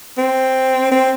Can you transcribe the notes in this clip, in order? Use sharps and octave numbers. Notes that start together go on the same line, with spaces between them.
C4
C4